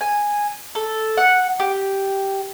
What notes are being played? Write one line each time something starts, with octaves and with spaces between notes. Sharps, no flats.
G#5
A4
F#5
G4